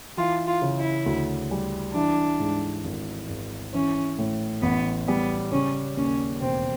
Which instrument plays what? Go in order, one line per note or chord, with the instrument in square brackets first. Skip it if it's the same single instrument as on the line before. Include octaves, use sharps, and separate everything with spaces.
[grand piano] E3 [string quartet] F4
[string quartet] F4
[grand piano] C#3
[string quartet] E4
[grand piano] D2
G3
[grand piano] E3 [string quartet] D4
[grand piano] G#2
G#1
G#1
[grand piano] E3 [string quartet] C#4
[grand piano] A2
[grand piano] A1 [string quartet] B3
[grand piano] G3 [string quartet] B3
[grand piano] C#3 [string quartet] C#4
[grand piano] D#2 [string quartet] C#4
[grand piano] E1 [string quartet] C4